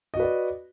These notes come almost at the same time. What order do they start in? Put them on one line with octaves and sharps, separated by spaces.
D#5 F#4 B4 D5